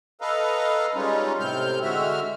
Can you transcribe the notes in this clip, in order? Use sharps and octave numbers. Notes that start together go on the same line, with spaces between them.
A4 B4 D#5 F5 A#5
G3 G#3 C#4 D#4 F4
A2 C3 C4 F6 G6
D3 G#3 F#4 E5 F6